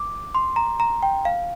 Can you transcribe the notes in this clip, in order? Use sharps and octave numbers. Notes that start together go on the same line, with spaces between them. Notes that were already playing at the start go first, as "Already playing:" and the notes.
Already playing: D6
C6
A#5
A#5
G5
F5